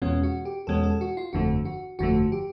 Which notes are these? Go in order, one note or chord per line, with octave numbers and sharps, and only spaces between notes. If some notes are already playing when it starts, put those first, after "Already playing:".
E2 B2 G#3 C#4 F4
F#4
G4
E2 B2 G#3 C#4 A4
A4
F#4
F4
G1 F2 D3 F3 A3 F#4
F#4
G1 F2 D3 F3 A3 F#4
G4